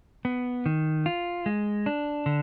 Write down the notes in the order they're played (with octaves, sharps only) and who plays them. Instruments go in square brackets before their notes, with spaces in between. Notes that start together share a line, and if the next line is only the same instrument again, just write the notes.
[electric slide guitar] B3
D#3
F4
G#3
D4
D3